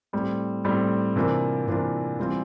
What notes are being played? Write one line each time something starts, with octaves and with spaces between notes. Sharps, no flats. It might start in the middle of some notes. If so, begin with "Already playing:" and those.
A2 G3 C4
A2 G3 C4
C3 E3 A#3 D4 F4
C3 E3 A#3 D4 F4
E3 G3 C4 F4